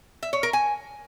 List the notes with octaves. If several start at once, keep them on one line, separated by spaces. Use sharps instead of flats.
E5
C#5
A#4
G#5